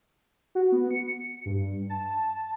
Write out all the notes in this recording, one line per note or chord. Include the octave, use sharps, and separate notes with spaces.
F#4
B3
C#7
G2
A5